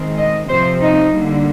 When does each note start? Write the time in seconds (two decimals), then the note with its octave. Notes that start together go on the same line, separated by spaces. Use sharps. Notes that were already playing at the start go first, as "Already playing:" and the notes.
Already playing: D#3 G#3 C4
0.18 D#5
0.49 C3 F3 C4 C5
0.81 D#4
1.12 D3 G3 A#3